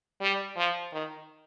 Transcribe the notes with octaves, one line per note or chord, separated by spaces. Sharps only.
G3
F3
D#3